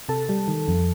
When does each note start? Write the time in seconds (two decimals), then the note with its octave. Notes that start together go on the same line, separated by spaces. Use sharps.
0.09 C3 A4 A5
0.29 G3
0.48 D#3
0.68 F2